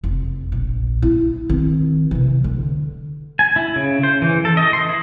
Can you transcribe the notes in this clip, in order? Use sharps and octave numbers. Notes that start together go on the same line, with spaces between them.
F1
A#1
E4
D#3 C4
C3 E3
D3
G#5
E4
C#3
C5
E3
A4
D#5
C6
E4